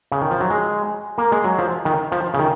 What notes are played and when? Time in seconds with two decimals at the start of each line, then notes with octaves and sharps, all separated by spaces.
0.12 C#3
0.21 D#3
0.31 F3
0.40 F#3
0.50 G#3
1.18 A#3
1.32 G#3
1.44 F#3
1.59 F3
1.85 D#3
2.12 F3
2.34 C#3
2.39 D#3